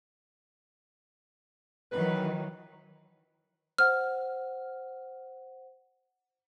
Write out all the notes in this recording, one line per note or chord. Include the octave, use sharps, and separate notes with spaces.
D#3 E3 F#3 B4
C5 F#5 F6